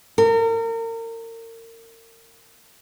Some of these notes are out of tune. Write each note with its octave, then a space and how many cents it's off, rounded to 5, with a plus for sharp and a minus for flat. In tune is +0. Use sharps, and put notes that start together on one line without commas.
A#4 -35